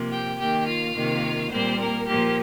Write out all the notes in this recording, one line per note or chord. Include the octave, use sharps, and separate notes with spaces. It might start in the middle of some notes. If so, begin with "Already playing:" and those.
Already playing: C3 F3 A#3
G4 G5
D#3 A#3 G4 G5
F4 F5
C3 D#3 A#3
A#2 G3 A#3 C4 C5
A#3 A#4
A#2 F3 A#3 G4